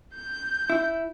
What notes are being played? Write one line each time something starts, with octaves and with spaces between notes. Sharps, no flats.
G6
E4